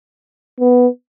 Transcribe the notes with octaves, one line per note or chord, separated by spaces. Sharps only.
B3